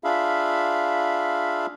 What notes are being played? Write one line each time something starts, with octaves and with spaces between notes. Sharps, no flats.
D4 F4 G#4 E5 F5 B5